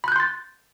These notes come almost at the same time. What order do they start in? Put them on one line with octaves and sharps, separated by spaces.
B5 F#6 G6 C6 A6